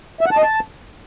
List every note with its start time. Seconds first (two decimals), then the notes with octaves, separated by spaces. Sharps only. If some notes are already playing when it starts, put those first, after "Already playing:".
0.21 E5
0.26 F#5
0.32 A5
0.37 D#5
0.42 A5